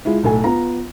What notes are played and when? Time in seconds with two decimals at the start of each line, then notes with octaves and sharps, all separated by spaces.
0.05 G#3 E4 F4
0.23 B1 A2 A4 G#5
0.44 B3 F4 A#5